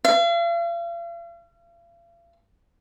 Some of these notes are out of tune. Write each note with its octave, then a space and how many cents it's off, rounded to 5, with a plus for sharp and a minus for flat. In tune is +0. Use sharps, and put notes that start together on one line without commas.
F5 -40